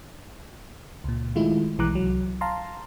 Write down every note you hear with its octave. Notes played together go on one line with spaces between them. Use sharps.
C#2 A#2
D#3 G#3 A3 E4 F4
B1 E3 G#3 A#5 D6 F#6
C2 F#3
F5 A5 A#5 C6